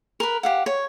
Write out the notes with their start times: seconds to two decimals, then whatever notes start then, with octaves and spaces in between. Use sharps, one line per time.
0.20 A#4 B4
0.43 G4 F5 F#5
0.66 C#5